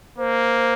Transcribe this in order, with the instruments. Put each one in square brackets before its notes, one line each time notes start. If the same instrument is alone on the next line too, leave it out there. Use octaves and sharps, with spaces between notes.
[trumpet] A#3 [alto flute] C5